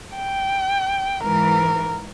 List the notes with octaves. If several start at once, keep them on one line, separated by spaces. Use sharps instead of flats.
G5
G#2 E3 A#4